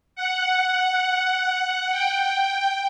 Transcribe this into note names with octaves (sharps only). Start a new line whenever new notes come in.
F#5
G5